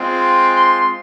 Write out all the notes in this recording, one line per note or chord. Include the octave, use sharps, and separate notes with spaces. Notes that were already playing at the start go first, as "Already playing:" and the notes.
Already playing: G#3 C4 F4
C6
C6